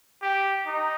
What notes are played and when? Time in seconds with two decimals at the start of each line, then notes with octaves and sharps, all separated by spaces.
0.23 G4
0.67 D#4